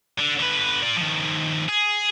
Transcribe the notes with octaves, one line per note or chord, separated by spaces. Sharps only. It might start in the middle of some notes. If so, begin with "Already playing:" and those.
D3
D3 B4
F4 D5
D#3 F3
G#4